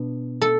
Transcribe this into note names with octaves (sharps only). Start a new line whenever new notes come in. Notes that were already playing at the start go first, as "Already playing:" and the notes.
Already playing: B2 D4
A4